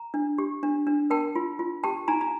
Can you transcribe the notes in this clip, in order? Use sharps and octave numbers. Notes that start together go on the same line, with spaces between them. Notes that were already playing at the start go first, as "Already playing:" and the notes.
Already playing: A#5
D4
G4
D4
D4
A#4 G5 A5
F4
F4
G4 G5 A5
D#4 G#5 A#5
A#5